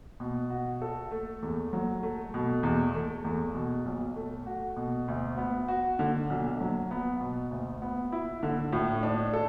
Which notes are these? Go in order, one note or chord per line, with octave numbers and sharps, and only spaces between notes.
B2
F#4
A4
A3
E2
F#3
A3
B2
E2
A3
E2
B2
B1
A3
F#4
B2
D2
B3
F#4
D3
B1
F#3
B3
B2
D2
B3
E4
D3
A2
D4
A4